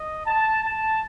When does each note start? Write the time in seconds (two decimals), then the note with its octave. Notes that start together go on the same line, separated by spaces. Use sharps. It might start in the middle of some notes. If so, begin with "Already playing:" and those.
Already playing: D#5
0.26 A5
0.63 A5